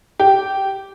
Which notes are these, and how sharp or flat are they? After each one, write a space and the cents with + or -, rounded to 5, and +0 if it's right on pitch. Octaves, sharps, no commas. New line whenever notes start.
G4 -10